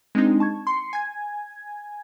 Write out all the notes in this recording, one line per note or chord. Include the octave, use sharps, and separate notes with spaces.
G#3 C4 D4 D#4
A5 C#6 G#6
C6 C7 C#7
G#5 G#6